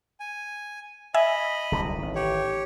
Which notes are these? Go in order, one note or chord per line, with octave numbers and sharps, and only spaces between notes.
G#5
D#5 E5 G#5 B5
D1 C2 D3
A1 D#3
G4 C#5